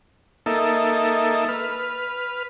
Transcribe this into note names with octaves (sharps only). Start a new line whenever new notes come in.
A#3 D#4 A4 E5
B4 F6